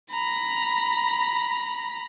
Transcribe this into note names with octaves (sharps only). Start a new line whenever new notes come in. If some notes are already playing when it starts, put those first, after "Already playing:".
A#5 B5